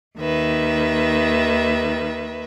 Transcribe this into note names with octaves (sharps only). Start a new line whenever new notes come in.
D#2 D#3 B4 E5